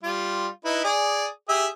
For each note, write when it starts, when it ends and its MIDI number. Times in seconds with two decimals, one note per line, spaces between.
0.03 0.47 55
0.03 0.47 65
0.65 0.84 63
0.65 0.84 64
0.65 0.84 71
0.84 1.26 68
0.84 1.26 74
1.49 1.67 67
1.49 1.67 68
1.49 1.67 76